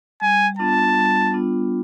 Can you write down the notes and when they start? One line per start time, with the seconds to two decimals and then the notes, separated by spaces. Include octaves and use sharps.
0.21 G3 G#5
0.59 B3 D4 F4 A5
0.97 G3
1.34 B3 D4 F4